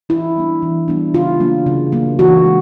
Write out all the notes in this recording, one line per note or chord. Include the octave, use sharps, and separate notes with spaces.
E3 E4
G3 B3 D4
E3
G3 B3 D4
C#3 F4
F#3 A#3 D4
C#3
F#3 A#3 D4
E3 F#4
G#3